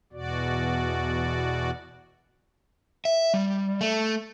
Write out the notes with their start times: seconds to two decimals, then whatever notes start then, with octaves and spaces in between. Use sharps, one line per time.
0.12 E2 B2 F#4 D5
3.05 E5
3.34 G3
3.81 A3